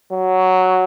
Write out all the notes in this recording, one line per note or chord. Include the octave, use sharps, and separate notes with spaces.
F#3